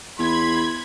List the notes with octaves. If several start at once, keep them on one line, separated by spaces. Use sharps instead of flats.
E2 B5 C6 G#6